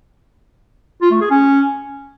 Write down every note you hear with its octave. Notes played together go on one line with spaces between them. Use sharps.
F4
A3
G#4
C#4